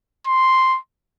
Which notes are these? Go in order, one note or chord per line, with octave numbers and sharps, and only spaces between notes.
C6